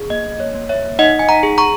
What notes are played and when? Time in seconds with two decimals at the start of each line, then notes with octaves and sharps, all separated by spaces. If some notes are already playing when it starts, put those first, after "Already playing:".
Already playing: G#4
0.10 A#3 D#5
0.40 C#5
0.55 A#3
0.69 C#5 E5
0.99 D#4 D#5 F#5
1.19 G#5
1.29 F#5 A#5
1.43 G#4
1.58 A#5 C#6